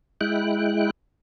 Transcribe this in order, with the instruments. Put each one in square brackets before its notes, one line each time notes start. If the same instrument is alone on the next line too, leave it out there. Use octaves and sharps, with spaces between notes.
[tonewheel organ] G#3 E4 G5 F#6